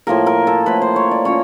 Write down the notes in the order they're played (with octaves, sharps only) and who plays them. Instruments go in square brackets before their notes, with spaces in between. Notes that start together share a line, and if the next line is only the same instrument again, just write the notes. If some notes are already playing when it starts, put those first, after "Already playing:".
[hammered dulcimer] A2 F3 A#3 A#4
A#4
A4
A2 F3 A#3 B4
C5
C#5
D5
F3 A#3 C#4 C#5